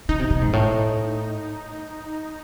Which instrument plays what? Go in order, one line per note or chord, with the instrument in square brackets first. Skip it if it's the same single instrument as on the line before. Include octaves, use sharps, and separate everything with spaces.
[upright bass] C#3 [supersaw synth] D#4
[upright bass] C3
C3
G#2
A2